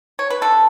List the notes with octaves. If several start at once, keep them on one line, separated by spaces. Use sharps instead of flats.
C#5
B4
D3 A4